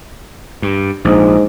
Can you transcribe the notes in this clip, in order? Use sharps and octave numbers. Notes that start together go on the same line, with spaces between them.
G2
A#1 G#2